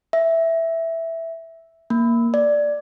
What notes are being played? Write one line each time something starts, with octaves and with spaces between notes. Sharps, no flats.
E5
A#3
D5